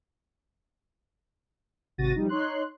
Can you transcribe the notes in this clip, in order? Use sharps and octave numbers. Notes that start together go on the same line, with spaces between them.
G#1 C3 F#4 A6 A#6 D#7
F3 G3 D#4
D#4 C#5 C6 F#6